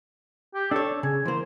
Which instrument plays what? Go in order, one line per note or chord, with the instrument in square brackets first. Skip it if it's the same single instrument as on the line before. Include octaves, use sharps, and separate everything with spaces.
[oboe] G4
[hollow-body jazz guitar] D4 C#5 [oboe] A4
[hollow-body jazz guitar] C#3 [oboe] G#5
[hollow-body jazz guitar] E3 A#3 [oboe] C5